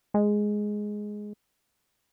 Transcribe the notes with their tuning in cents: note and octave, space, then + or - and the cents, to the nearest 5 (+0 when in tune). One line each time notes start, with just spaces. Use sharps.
G#3 +5